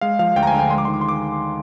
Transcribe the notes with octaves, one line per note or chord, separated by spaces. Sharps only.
G#3 F5
F3 F5
D2 G5
A#5
G#5
D3
G5
G#3 C6
D6
D#3 C6
D6
C6
D6